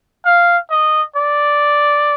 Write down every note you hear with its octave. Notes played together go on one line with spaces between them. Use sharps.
F5
D#5
D5